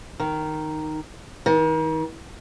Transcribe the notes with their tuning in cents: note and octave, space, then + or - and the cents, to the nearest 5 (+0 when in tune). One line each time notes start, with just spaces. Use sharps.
D#3 -5
D#3 +35